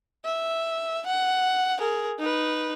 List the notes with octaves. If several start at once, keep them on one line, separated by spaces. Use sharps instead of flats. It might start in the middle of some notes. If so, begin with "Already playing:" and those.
E5
F#5
G#4 A#4
D#4 B4